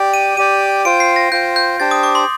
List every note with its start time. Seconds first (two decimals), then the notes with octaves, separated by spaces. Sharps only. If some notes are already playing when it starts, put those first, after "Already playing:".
Already playing: G4 D5 G5
0.14 D#7
0.37 G4 D5 G5 D#7
0.85 F4 C5 G5 D7
1.00 C7
1.16 A#6
1.32 F4 C5 G5 G6
1.56 G6
1.80 D4 G4 C5 G5 A6
1.91 D#6
2.03 D6
2.15 C6